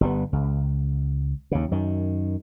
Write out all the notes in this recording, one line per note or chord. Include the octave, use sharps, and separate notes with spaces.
G1 G3 B3
C#2
D#2 C#3
F#2 D#3